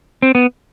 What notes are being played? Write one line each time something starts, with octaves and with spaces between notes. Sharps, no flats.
C4
B3